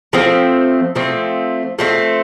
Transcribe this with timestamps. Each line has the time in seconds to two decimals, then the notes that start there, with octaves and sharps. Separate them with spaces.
0.13 F3 A3 C4
0.95 F3 A3 C4
1.79 F3 A3 C4